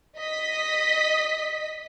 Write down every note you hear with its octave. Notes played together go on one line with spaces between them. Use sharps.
D#5 B6